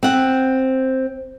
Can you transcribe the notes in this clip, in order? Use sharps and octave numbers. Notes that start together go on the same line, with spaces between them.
C4 F#5